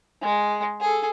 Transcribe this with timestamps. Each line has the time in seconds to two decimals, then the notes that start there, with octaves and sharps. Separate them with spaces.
0.22 G#3
0.81 G#4 A4